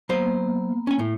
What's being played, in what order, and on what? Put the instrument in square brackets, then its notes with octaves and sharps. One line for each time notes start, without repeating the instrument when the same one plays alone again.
[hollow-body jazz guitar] F#3 C5 [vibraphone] A#3 B3
[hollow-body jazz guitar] C#4 G#5
A2